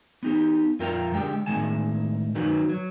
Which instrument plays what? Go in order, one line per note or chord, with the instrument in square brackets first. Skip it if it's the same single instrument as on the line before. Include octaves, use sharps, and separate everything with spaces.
[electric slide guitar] B3 D#4 G4
F2 F4 A#4 G5 G#5 A#5
D3 G#3 G4 G5
A2 D#3 G#3 G#5 A5
D#3 F#3 D#4 F#4 B4
F#3